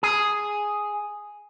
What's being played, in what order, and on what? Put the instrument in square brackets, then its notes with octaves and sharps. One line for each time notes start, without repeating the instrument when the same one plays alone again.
[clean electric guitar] G#4